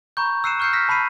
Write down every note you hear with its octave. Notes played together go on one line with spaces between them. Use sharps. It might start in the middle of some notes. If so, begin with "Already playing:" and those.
A#5 B5 C#6 G6
E6 F#6 C7 C#7 D#7 E7
C#6 F6 G6 C7 C#7
E6 F6 A#6 B6
A5 B5 B6 C7 D#7